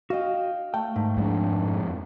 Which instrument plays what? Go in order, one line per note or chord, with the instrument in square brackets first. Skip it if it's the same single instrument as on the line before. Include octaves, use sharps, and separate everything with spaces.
[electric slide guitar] F#4 D#5 [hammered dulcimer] F5 G5
[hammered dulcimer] A3 [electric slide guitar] G5
[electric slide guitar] G#2 [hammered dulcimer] D#3
[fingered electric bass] F2 G#3 D4